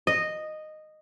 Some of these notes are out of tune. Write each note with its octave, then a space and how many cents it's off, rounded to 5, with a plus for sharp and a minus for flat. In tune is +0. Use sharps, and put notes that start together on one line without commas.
D#5 -10